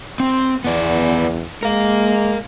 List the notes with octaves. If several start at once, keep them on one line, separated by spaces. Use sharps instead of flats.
C4
E2 B3 D5
G#3 A#4 F5